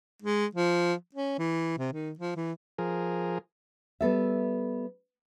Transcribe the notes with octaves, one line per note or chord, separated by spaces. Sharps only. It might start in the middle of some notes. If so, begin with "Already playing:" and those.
G#3
F3
C#4
E3
C3
D#3
F3
E3
F3 G#4 A#4
G3 B3 A4 E5